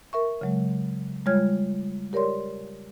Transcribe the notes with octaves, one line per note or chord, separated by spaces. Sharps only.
A#4 E5 C#6
C#3 F#3 G#3
G3 G#3 F4 C#5 F6 G#6
G4 A#4 C#5 D5 C6